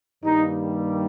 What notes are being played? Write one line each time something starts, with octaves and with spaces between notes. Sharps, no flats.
G2 D#3 G3 A#3 D#4